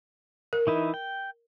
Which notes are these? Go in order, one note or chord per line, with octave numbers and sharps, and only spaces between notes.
A#4
E3 D#4 E4
G5